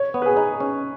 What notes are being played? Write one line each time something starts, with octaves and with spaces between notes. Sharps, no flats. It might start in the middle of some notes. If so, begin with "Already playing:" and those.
Already playing: C#5
B3
B4
G#4
D#4
C#4